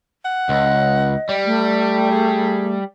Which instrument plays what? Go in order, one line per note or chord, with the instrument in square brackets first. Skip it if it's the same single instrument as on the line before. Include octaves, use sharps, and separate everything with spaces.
[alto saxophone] F#5
[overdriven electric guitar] C#2 [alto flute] D#5
[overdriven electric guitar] G3 [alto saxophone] D5
[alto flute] A3
[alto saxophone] G#4